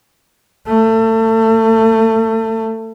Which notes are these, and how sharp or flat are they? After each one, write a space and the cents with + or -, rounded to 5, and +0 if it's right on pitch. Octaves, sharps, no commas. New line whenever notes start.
A3 +30